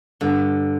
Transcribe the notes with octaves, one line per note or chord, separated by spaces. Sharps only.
G2 D3